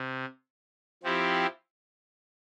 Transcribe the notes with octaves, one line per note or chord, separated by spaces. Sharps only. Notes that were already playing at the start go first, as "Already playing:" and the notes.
Already playing: C3
F3 C4 E4 G4